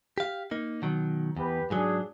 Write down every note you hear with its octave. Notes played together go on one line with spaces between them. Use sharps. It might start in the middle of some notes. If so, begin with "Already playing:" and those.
G4 F5
A#3 D#4
B2 D#3 F#3
E2 G4 B4
G#2 F#3 D4 G#4